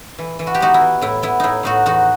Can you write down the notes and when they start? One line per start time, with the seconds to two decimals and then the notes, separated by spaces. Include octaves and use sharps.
0.18 E3
0.39 E3
0.47 F#4
0.54 G4
0.60 B3 D#4 F#4
0.74 E4
0.81 E3
1.02 A2 E4
1.23 B3 E4
1.40 A2 D#4 E4
1.63 A2 D#4 F#4
1.86 E2 D#4 F#4